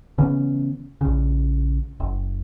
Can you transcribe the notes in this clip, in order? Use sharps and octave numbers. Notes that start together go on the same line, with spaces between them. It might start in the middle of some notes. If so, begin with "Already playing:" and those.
C#3 E3 B3 C#4
A#1 C#3
F#1